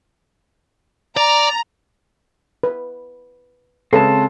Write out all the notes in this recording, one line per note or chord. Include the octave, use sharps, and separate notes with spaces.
D5 A#5
B4
C#3 G#3 C4 A4 B4 A5